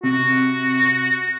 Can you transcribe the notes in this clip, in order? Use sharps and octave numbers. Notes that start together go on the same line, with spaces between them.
C3 F#4